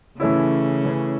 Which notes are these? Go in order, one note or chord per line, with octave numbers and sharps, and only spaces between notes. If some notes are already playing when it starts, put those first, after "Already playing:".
C#3 E3 A3 C#4 E4
E3 A3 C#4 E4